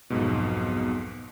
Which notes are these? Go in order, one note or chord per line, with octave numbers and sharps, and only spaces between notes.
B1 F2 G#2 B2